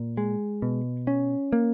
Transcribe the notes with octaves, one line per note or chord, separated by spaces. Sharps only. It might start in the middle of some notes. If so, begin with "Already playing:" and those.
Already playing: A#2
G#3
B2
C#4
A#3